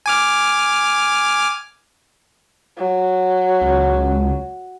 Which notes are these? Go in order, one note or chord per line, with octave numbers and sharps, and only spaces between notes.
G#5 D6 F6
F#3
C#2